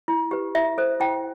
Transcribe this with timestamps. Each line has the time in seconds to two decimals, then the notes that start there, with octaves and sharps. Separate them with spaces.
0.08 E4
0.31 G4 B4
0.55 E4 E5
0.78 A4 C5
1.00 E4 G5